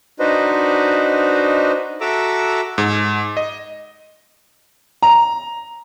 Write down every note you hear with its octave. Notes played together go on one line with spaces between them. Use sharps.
D4 D#4 F#4 B4 C5 D#5
F#4 A4 E5 A#5 D6 E6
G#2
D#5
A#5